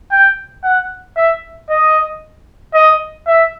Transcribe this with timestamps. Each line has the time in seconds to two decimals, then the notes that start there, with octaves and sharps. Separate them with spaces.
0.12 G5
0.63 F#5
1.16 E5
1.70 D#5
2.74 D#5
3.27 E5